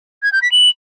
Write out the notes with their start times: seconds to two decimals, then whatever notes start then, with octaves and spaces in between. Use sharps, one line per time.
0.23 G#6
0.32 G6
0.42 B6
0.52 F#7